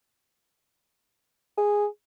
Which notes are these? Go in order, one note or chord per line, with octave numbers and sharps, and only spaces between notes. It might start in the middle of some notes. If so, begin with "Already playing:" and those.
G#4